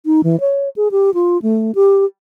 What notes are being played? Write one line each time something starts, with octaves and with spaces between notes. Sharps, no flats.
D#4
E3
C#5
G#4
G4
F4
A3
G4